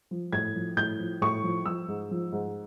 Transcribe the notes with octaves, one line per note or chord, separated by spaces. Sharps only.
F3
A2 G#6
F3
A2 G6
F3
A2 C#6
F3
F3 E6
G#2
F3
G#2